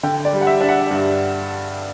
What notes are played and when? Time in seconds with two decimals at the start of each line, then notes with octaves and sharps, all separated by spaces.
0.03 D3 G5
0.25 D5
0.33 G3
0.41 F#5
0.47 E5
0.61 D4
0.69 F#5
0.91 G2